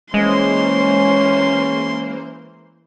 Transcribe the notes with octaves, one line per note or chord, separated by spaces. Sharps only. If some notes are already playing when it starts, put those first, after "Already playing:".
E3 G#3 A#3 C#4 C5 C6